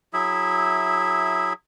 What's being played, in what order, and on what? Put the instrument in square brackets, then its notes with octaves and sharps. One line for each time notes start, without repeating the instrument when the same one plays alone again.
[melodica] F#3 E4 G#4 E5